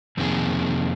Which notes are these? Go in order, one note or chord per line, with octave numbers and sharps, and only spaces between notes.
F2 C3 D#3 A#3 G#4